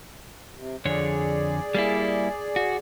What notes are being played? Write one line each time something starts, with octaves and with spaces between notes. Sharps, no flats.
C3
F2 D3 G#4 C#5 D5
G3 A#3 E4
F#4